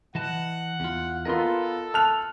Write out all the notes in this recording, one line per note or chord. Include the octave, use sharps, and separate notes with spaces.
E3 D#5 F#5 A5
E2 F4
B3 F4 A4 A#4 D#5 C6
A5 F6 F#6 F7